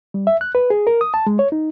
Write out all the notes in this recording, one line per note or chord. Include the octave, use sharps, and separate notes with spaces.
G3
E5
F#6
B4
G#4
A#4
D#6
A5
G#3
C#5
D#4